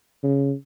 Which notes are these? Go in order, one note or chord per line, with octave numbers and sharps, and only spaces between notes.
C#3